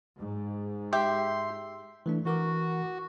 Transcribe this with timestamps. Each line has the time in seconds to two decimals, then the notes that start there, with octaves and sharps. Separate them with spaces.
0.19 G#2
0.93 G4 E5 G5 C6
2.06 E3 A3 D4
2.25 E3 F#4 A#4 D6